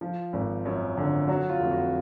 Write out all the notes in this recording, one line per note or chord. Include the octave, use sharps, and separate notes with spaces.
F3
G#1
F#2
D3
F#3 F#4
F4
F1
F#4